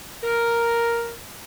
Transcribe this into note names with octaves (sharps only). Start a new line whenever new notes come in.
A#4